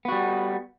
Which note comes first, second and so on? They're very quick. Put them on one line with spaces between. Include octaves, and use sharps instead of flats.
B3 F#4 G3